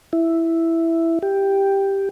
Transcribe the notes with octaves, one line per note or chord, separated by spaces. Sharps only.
E4
G4